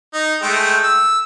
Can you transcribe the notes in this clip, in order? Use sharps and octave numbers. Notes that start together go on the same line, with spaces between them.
D#4
G#3 A3 G5
E6